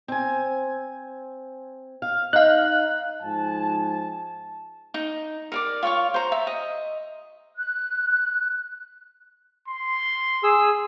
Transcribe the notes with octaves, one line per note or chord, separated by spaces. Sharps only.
C4 G#5
F5
D#4 F5 F#6
G#2 F3 G#5 A5
D#4
A#4 D5 D6
F4 C#5 F5 C#6
C5 A#5
E5
D#5
F#6
C6
G#4 E6